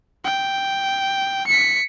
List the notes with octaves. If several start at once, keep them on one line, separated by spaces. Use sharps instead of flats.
G5
B6 C#7